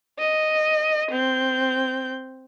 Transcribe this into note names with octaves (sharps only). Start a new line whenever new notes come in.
D#5
C4 G6